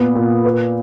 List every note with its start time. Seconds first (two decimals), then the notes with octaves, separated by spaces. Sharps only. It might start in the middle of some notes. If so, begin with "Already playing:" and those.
Already playing: A#2 B3
0.15 A#2
0.45 B4